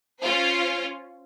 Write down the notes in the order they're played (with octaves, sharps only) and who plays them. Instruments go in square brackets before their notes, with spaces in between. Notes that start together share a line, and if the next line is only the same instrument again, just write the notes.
[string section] C#4 F4 C5